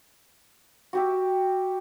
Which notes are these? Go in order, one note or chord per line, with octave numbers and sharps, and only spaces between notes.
F#4 G4 E5